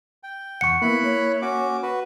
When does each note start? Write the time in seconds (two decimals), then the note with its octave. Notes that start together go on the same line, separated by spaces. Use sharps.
0.23 G5
0.61 E2 F#5 C#6 C#7
0.82 A#3 B3 E4 B5 F#6
1.04 A#3 C#5
1.42 C#4 F#4 D6
1.83 F#4 B4